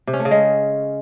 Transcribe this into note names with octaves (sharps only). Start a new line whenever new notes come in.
C3
C#4
A3
C#3
G#3